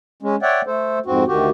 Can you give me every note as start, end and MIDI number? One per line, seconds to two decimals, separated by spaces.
0.22 0.36 56
0.22 0.36 61
0.42 0.62 73
0.42 0.62 74
0.42 0.62 76
0.42 0.62 78
0.42 0.62 79
0.67 0.99 57
0.67 0.99 69
0.67 0.99 72
1.06 1.24 41
1.06 1.24 44
1.06 1.24 60
1.06 1.24 66
1.28 1.50 38
1.28 1.50 51
1.28 1.50 66
1.28 1.50 67